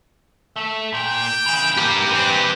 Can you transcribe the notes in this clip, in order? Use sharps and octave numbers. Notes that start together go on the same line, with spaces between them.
A3 E5
A#2 G5
C#3 E3
A#3 G4 B4
E3 C4